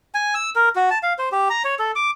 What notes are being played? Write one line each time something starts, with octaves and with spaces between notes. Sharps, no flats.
G#5
E6
A#4
F#4
A5
F5
C5
G4
A#5
C#5
A4
D6